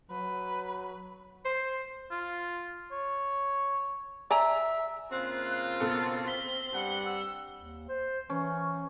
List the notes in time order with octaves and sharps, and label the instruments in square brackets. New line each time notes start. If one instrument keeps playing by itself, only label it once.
[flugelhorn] F#3 [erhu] B4
[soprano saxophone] C5
[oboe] F4
C#5
[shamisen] D5 G#5 A#5 [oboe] E5
[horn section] C#3 A#3 F4 [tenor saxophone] C4 [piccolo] F#6
[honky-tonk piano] B2 A4 [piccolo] E6
[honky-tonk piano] B6 [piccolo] G7
[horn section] G2 G3 F#5
[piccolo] E6
[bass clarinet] D#2
C5
[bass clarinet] E3 [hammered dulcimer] C#4